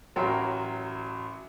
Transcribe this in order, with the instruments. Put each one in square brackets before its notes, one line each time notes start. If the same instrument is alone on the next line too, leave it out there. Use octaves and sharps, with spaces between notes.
[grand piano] A1 F#3 A#4 G5 C6